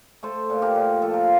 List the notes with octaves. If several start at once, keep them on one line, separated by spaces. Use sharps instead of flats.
A3 A4 C5
A#2
G4 A#4
A#2
F3 A4
A#4
F4